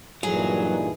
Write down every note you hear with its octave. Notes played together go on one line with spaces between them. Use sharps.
G2 A#2 E3 F#3 D#4 G#4